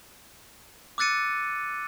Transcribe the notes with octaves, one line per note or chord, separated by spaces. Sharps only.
D6 E6 F#6 A6 C#7 D#7